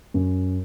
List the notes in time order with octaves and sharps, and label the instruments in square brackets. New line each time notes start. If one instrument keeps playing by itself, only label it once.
[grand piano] F#2